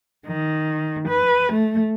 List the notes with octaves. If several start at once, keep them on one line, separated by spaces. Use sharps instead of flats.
D#3
B4
A3